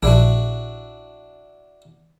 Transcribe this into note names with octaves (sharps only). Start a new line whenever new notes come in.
A#1 D4 E4 F#4